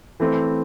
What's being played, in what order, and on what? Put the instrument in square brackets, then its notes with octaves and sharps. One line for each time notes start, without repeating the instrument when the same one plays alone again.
[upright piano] E3 A3 C4